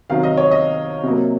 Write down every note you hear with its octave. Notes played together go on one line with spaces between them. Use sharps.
C3 D#3 F#3 F5
D#5
C#5
D#5
C3 F#3 A#3